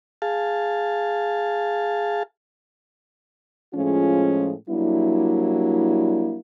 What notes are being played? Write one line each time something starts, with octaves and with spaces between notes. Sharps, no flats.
G#4 F5 A5
A2 F3 G#3 C#4 F4 G#4
F#3 G3 A#3 D4 E4